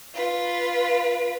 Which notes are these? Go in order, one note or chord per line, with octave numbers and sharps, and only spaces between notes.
F4 B4